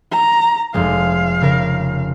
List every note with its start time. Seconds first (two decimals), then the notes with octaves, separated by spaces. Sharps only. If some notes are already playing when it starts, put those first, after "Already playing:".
0.11 A#5
0.74 F1 G#3 F5
1.41 C#3 A#4